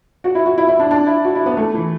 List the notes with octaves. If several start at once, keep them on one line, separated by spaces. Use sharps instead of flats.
F#4
E4
F#4
E4
E4
D4
D4
E4
F#4
E4
B3
A3
E3